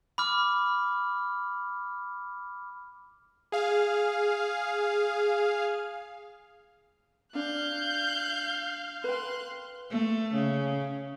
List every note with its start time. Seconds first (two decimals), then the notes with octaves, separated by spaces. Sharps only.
0.18 B5 D6 F6
3.52 G#4 F5
7.35 D4 F5 F#6 G6
9.04 B4 G5 C6 F#6
9.91 A3
10.34 C#3